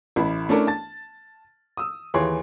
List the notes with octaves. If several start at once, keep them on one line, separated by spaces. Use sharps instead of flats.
A1 E4 B5
A3 C#4 D4 E4 A4 A#4
A5 A6
D#6 E6
D#2 E3 G#4 C#5 C6